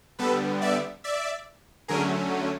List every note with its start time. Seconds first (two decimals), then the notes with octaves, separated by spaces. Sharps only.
0.19 D3 G3 B3 A4 B4
0.61 D5 E5
1.04 D5 E5
1.88 D3 F#3 A3 C#4 G#4 A#4